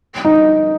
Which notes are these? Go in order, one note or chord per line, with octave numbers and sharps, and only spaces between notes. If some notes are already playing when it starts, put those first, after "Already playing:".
D#4